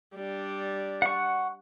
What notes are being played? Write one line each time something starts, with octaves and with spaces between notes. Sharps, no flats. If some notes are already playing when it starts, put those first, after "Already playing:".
G3 D4
F#5 C#6